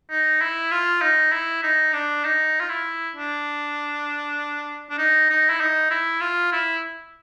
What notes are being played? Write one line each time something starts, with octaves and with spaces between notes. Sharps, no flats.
D#4
E4
F4
D#4
E4
D#4
D4
D#4
F4
E4
D4
D4
D#4
D#4
E4
D#4
E4
F4
E4